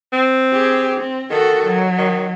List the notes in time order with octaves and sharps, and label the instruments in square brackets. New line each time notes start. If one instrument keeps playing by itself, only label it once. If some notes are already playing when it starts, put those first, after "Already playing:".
[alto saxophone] C4
[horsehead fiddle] G4 G#4
C4
[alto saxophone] D#3 [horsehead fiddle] F#4 A4
[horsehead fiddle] F#3
[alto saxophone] D#3